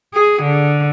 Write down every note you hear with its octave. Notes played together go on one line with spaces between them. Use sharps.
G#4
D3